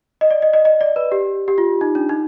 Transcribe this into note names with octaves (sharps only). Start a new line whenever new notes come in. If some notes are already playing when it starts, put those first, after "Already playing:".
D#5
D5
D#5
D#5
D#5
D5
B4
G4
G4
F4
D#4
D4
D#4